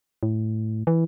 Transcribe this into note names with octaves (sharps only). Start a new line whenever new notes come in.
A2
E3